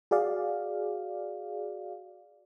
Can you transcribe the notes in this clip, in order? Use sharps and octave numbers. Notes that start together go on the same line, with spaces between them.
F#4 G#4 D5 F5